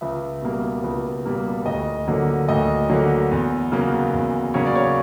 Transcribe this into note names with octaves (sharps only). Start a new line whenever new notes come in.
C#2 E5
B2 G3 A#3
C#2
B2 G3 A#3
D2 D#5
D3 F#3 A#3
D2 D#5
D3 F#3 A#3
E2
C#3 F#3 A#3
E2
C#3 F#3 A#3 C#5
D5
C#5